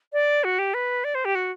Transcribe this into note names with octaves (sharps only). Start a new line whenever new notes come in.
D5
F#4
G4
B4
D5
C5
G4
F#4